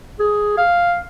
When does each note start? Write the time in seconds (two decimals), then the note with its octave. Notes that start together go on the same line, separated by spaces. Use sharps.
0.20 G#4
0.58 F5